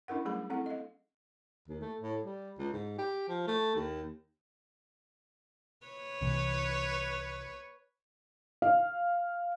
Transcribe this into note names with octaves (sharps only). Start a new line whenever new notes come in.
C#4 D4 E4 A#4 F#5
F#3 G3 A3 G#4 B5
C4 E4 A4 F#5
D#5 F5
D#2
A3
A2
G3
C#2
G#2
G4
F3
A3
D#2
B4 C#5
C2 C3 E3
F5